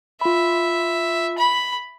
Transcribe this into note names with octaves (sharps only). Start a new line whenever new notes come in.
F4 E5 B5
B5